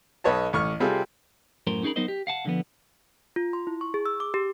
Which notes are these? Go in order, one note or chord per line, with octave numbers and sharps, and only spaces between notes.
B1 B4 C#5 D#5 A5
A1 C#6 F6
C3 G3 C4 F4 G#4 A4
F#2 A2 A#4 C5
C#4 D#4 G#4 A#4 B5
F#3 B3 D#4 A#4 C5 D#5
G4
F5 F#5 A5
D3 F3 B3
F4
C6
E4
C#6
G#4
E6
D6
G4